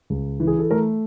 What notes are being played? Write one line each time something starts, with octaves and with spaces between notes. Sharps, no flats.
C#2
E3
G#4
A4
A3 A#4